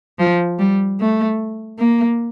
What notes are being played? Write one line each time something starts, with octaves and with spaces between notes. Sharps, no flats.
F3
G3
A3
A#3